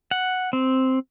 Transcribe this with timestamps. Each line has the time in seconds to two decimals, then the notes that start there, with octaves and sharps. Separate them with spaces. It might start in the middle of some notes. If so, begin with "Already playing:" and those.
0.11 F#5
0.53 C4